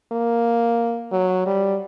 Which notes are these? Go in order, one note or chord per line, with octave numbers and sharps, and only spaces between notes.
A#3
F#3
G3